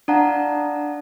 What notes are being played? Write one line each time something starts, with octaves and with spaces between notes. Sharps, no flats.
D4 D5 F5 F#5 A5 A#5